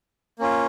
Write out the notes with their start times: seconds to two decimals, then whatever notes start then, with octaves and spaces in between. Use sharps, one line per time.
0.39 A#3 C#4 F4